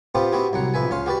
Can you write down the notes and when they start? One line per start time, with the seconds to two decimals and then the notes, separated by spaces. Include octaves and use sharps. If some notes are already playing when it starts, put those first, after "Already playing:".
0.15 B3 C4 F4 G4 C5
0.32 B3 C4 E4 F#4 G4
0.53 C2 F#3 F#5
0.74 B1 F2 B4 E5 G#5
0.91 C#2 C#4 F5 C6
1.06 F#4 G4 B4 D5